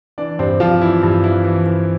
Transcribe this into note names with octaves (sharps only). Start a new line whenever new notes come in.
E3 D4 D5
G2 C4 C5
G2 F3 F4
E3 E4
G2 E4
E3 E4
E3
E3